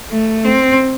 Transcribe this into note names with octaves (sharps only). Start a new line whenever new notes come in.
A3
C4